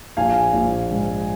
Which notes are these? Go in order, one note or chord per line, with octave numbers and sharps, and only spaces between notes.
A#1 F5 G#5
A#1
G#2